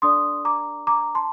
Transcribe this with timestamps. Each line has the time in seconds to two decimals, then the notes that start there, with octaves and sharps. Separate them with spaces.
0.02 D4 A4 D5 C6 D#6
0.45 A#5 D6
0.87 A#5 D6
1.15 A5 C6